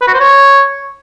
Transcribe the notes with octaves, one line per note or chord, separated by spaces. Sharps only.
B4
F#4
C5
C#5